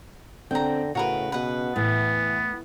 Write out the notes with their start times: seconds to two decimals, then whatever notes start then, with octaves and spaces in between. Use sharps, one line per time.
0.51 D3 C4 G5 A#5
0.95 A2 C#3 F#4 A#4 B4
1.32 B2 B4 F#5
1.76 A2 E3 B3